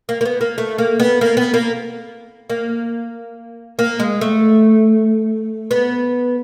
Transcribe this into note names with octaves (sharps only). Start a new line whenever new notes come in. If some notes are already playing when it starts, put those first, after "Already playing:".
A#3
A#3
B3
A#3
A3
A#3
B3
A#3
B3
A#3
A#3
A#3
G#3
A3
B3